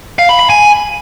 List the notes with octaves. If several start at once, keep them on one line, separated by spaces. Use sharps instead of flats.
F5
B5
B5
G#5